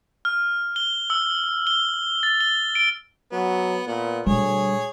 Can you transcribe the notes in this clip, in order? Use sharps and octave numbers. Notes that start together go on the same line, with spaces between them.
F6
G7
E6
G7
A6
G7
D7
F#3 B3
A#2 B3
D2 B2 G3 G#4 C#5